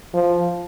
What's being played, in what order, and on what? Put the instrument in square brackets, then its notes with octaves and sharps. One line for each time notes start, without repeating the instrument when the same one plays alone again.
[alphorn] F3